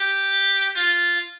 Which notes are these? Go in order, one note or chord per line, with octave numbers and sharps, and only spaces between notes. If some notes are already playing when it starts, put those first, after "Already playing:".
Already playing: G4
F4